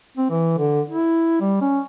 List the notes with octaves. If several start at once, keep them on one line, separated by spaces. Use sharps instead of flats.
C4
E3
D3
E4
G3
C#4